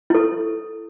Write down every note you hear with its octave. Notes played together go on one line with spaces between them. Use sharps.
E4 A4